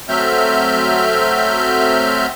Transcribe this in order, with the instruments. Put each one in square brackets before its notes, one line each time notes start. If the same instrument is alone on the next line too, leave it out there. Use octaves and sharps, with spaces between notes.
[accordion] F#3 A3 C4 E5 F6 G6